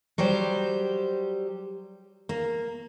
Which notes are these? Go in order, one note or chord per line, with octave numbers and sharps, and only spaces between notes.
F#3 G3 G4 C5
A#3